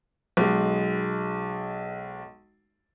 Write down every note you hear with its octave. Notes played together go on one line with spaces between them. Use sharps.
B1 G#3